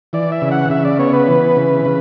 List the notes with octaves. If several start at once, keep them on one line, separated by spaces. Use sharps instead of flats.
E3 D5
E5
C#3
F#5
C#3 E5
D5
B3 C#5
B4
E3
C#3
C#3